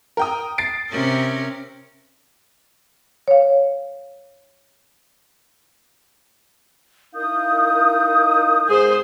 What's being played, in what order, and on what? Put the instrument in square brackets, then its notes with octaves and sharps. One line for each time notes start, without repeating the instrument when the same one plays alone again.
[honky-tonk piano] A#4 G5 D#6
A6 C7 D7
[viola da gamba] C3 C#4 A#4
[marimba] C#5 F5
[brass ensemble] D#4 E4 F5 [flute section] A#4 D#6 G6
[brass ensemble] G#2 [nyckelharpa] G#4 C5